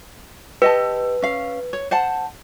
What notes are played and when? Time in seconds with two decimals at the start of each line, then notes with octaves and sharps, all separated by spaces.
0.62 G4 B4 D#5 A5
1.22 C#4 F5
1.73 C#5
1.91 C5 F#5 A5